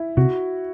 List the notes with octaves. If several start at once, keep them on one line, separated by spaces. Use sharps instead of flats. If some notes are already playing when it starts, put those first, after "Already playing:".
Already playing: E4
C3 F#4